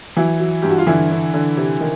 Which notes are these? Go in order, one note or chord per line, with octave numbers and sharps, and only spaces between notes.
E3 F#3 E4
F#3
G2 G4
F#4
F4
D3 E3 E4
D3
D3
C3
D#3